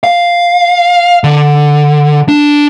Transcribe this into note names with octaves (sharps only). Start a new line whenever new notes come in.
F5
D3
D4